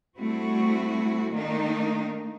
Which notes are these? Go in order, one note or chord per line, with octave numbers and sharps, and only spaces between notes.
G3 A3 C4 E4 F#4
D#3 A3 A#3 D4 D#4